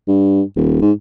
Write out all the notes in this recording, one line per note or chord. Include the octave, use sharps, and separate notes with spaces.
G2
D#1
G#2